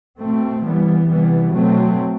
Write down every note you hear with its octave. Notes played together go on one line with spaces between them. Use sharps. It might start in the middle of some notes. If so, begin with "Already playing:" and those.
B2 A3 C4
E3 G3 B3
C3 E3 G3 B3
B2 F#3 A3 C4